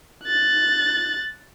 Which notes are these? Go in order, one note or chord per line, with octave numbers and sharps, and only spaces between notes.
F#6 A6